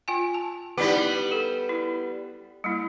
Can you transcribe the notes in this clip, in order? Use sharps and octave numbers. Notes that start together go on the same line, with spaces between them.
F4 G5 G#5
A5
G3 B3 D#4 E4 G4
A4
E4
G3 A#3 E4